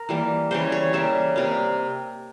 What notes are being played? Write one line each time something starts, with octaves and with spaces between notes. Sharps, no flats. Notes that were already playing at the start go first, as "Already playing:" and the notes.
Already playing: A#4
E3 G3 A#3
C#3 E3 G3 C5
C#5
C#3 G3 A#3 E5
C3 G3 A#3